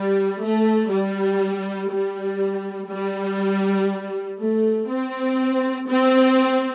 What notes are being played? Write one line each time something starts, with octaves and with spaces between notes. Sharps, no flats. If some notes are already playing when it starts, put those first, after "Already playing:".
Already playing: G3
A3
G3
G3
G3
A3
C4
C4